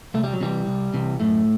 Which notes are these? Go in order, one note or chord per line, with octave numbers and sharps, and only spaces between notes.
C2 A3
G3
F#3
C3 E3 G3
C2
C3 E3
F#2 A2 A3